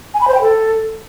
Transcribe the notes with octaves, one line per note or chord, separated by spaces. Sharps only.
G#5
B5
C5
G5
A4